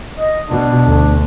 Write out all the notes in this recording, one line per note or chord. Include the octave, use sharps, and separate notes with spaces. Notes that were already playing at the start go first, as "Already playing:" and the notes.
D#5
B2 D4
D2